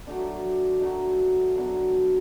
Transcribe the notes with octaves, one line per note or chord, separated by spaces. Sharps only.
F#3 A3 D4
F#3 A3 D4
F#3 B3 D4